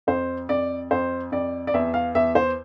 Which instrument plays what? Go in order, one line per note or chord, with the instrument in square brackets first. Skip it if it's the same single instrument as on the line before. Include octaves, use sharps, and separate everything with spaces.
[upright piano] F2 C5
F2 D5
F2 C5
F2 D5
D5
E2 E5
F5
E2 E5
C5